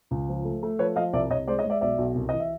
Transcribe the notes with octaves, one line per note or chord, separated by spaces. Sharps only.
C#2
F3
A3
A3
F3 B4 C#5
F3 D#5 F5
C2 D5 E5
C2 C#5 D#5
G#3 C5 D5
C#5 D#5
G#3
D5 E5
B1 D5 E5
B1
C2
E3 D#5
E5